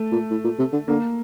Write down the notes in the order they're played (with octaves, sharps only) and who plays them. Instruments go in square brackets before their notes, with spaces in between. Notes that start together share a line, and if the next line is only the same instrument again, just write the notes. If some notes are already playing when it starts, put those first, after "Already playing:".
Already playing: [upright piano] A3
[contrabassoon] A#2
A2
A#2
C3
D3
[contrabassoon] D3 [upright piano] A#3